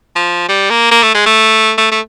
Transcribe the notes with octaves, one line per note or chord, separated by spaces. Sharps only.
F3
G3
A#3
A#3
A3
G#3
A3
A3
A3